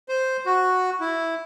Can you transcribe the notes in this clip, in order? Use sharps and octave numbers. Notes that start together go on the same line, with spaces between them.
C5
F#4
E4